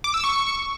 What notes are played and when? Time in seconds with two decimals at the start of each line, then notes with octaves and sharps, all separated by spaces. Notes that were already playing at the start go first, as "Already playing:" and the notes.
0.04 D6
0.14 E6
0.24 C#6